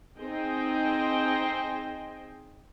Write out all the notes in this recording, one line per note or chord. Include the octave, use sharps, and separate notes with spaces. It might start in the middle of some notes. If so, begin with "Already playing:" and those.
C4 D#4 G#4 C5 D#5 G5